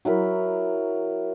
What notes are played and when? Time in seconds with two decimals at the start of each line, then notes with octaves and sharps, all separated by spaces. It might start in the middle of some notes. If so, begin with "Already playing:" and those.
0.05 F#3 E4 A#4 B5